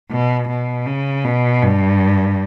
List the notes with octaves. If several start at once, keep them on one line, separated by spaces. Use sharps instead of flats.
B2
B2
C#3
B2
G2